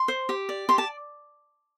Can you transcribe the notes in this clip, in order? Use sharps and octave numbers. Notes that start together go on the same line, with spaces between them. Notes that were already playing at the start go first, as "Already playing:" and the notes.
Already playing: C6
C5
G4
D5
G4 C6
A5